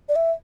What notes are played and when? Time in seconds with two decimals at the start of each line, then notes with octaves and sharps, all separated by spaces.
0.09 D5
0.16 E5